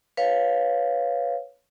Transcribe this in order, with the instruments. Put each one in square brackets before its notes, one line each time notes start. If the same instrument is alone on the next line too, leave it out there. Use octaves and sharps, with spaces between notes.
[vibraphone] B4 C#5 F5